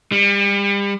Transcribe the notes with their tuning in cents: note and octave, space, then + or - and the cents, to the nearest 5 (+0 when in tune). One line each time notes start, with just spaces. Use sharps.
G3 +35